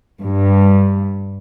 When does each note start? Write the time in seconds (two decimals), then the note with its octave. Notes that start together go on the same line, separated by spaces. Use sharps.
0.21 G2